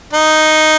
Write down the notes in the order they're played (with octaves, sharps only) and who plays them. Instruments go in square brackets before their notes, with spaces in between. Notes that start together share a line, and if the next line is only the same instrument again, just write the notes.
[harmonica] D#4